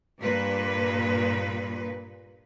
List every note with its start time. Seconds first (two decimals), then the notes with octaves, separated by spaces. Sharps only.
0.20 G2 A#2 B4